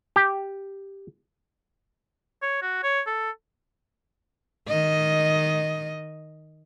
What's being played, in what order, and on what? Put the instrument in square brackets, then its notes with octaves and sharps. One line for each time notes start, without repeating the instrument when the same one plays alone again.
[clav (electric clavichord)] G4
[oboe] C#5
F#4
C#5
A4
[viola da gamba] D#3 D#5